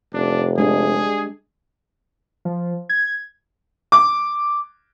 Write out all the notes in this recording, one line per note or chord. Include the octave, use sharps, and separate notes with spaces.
F1 D4
G#3 D4 G4 G#4
F3
G#6
D6